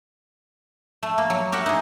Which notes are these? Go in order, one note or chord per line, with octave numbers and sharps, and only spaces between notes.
A3
A#3
F#3
G4 A#4 E5 F#5
D#4 G#4